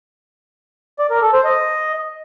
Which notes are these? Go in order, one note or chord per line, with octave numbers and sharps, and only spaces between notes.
D5
A#4
A4
C5
D#5